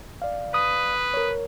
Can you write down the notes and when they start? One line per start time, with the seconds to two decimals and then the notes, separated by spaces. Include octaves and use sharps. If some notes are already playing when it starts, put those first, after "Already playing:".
0.22 D5 F5
0.54 B4 D#6
1.14 A#4 C#5